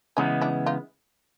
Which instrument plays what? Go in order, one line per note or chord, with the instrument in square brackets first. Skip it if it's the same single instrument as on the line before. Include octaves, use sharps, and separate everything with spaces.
[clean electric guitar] C#3 E3 G#3 B3 [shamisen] C#4 D#4
[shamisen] D4 E4
D#4 F4